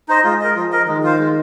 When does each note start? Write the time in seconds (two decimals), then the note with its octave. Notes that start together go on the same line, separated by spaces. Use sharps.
0.08 D#4 C5 D#5
0.24 G#3 F4
0.41 A#4 D#5
0.55 F3 F4
0.72 A#4 D#5
0.87 D#3 G#3
1.03 F4 C5 F5
1.19 G#3